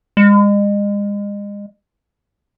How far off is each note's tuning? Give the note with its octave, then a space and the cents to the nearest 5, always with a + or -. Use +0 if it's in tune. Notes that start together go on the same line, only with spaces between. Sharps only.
G#3 -35